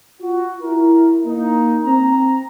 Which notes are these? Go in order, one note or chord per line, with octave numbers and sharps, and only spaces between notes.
F4 F#4
E4 A#4
A#3 D#4
C4 A#5